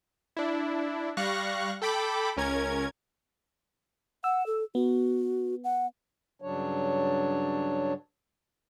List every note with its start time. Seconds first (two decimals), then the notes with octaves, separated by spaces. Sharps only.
0.37 D4 E4
1.17 G3 F5 C#6 F#6 A#6
1.82 A4 G5 B5 D6
2.37 C#2 C#4 A#4 G#6
4.24 F#5 E6
4.46 A4
4.75 B3 F#4
5.64 F#5
6.42 G2 C#3 F#3 D4 C#5